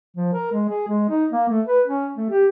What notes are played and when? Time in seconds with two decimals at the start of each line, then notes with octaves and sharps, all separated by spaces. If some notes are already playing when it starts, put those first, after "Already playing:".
0.16 F3
0.33 A#4
0.52 G#3
0.69 G#4
0.88 G#3
1.09 D#4
1.31 A#3
1.49 A3
1.67 B4
1.87 C#4
2.17 A3
2.30 G4